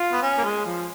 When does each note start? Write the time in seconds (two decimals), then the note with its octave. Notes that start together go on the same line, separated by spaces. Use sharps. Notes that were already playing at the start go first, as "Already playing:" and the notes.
Already playing: F4
0.12 B3
0.22 C#4
0.38 A#3
0.44 G#3
0.65 F3